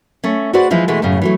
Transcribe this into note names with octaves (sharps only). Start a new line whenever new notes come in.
A3 C#4
F#4 G#4 B4 C5 D5 F#5
E3 F3 G#3 E4
B2 E3 G#3 A3
F#2 A2 C#3
E3 F#3 A3